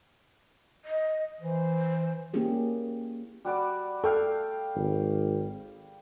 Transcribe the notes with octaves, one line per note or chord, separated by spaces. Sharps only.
D#5
E3 C5
A#3 C#4 E4 G4 G#4
G3 F#4 D5
A4 F5 G5 C#6
G#1